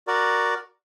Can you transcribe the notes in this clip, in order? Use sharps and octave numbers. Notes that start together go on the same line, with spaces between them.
F#4 A#4 D5